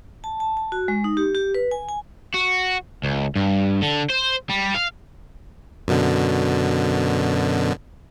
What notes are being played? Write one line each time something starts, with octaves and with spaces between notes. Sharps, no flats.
A5
A5
A5
F#4
G#3
D#4
G4
G4
B4
G#5
G#5
F#4
C#2
G2
D3
C5
G3
F5
F#2 B2 D3